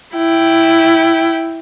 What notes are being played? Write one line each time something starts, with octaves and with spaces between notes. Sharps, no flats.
E4 G5